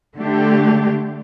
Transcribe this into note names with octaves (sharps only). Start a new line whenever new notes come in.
D3 A3 D4 G4